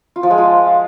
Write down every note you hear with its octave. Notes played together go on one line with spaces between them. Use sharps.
F4
F3
G#3
F4